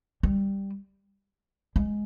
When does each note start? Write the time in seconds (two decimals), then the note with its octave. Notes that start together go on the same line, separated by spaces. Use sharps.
0.23 G3
1.76 G#3